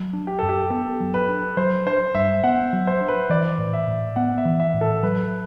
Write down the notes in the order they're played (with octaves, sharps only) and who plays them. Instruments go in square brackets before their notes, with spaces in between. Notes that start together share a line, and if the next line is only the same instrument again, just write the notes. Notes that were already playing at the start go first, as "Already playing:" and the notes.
Already playing: [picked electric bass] F#3
D4
[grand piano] G4
[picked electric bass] F#2 [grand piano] A4
[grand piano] G4
[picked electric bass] B3 [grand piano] A4
[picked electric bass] F#3
[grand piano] B4
[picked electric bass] D4
[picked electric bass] F#3 [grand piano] C5
[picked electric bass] D4 [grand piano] C5
[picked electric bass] G2 [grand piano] E5
[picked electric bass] B3 [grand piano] F#5
[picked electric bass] F#3
[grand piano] C5
[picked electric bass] D4
[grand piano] B4
[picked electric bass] E3 [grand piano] D5
[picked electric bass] A2
[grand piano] E5
[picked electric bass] A2
[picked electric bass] B3 [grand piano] F#5
[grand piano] E5
[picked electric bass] E3
[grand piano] E5
[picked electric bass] A2
[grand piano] A4
[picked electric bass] F#3 [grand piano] B4